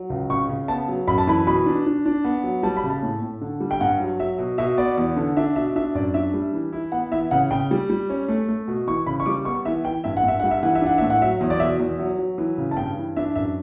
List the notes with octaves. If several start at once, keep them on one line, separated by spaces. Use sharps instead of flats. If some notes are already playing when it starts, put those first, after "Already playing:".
Already playing: F#3
C#2
C#3 C#6
C#3
B3 A5
F#3
F#2 B5
A5
E3 B5
B2 B5
D4
D4
D4
B3
F#3
G3 A5
B5
C#3
A5
A2
A2
D3
G3
G5
G2 F#5
F#3
F#3 E5
B2
B2 E5
B3 D5
E2
D3
D4 E5
B2 E5
D4 E5
F#2 D5
D4 E5
G3
E3
E4
B3 F#5
E3 E5
C#3 F#5
C#3 G5
G3
G3
C#4
A3
A3
B2
E3 C#6
C#3 B5
C#6
G3 D6
B3 C#6
E3 E5
E3 G5
G2 E5
F#5
G2 E5
G3 F#5
E5
E3 F#5
E5
D4 F#5
A2 E5
F#5
F#3 E5
E2
D5
B2 E5
E2
F#3
F#3
E3
C#3
A5
G2 G5
E3
D4 E5
F#2 E5